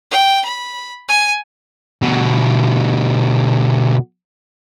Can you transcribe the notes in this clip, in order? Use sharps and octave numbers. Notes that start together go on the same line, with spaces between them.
G5
B5
G#5
B2 D3